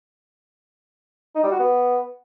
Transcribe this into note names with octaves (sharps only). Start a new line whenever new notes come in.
D#4
G3
F#4
B3